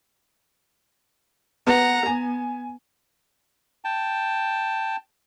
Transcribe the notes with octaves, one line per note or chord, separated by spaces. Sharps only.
B3 F#5 A#5
B3 G#5
G5 A5